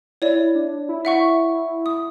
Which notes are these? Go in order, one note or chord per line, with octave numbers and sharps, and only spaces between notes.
E4 C#5 D5
D4
E4
E5 F#5 C#6
D#6